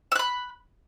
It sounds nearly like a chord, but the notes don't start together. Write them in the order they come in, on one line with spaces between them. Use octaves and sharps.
E6 F#6 B5